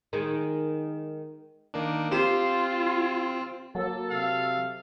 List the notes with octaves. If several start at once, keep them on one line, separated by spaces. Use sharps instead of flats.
D#3 G#3
D#3 A#3 D4
C4 F4 G4 C5
F#3 A#3 A4
C3 F5